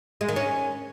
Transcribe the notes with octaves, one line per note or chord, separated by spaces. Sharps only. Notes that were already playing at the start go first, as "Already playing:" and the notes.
G#3
D#3
C#4